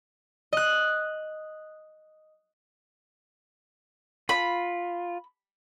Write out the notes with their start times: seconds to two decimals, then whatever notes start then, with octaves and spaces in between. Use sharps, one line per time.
0.53 D#5 F#6
4.29 F4 B5